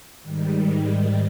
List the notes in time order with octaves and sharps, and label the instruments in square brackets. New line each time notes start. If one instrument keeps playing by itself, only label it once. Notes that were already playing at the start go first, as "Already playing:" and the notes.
[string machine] G#2 D#3 G3